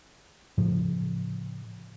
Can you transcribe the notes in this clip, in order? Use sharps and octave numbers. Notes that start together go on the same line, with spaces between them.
A2 C#3 F3